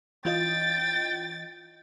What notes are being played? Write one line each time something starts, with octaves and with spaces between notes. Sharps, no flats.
E3 F4 D#5 G5 A6